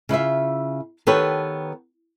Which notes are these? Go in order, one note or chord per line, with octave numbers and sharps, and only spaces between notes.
C#3 E4 F4 E5
D#3 B3 G4 A4 B4 C#5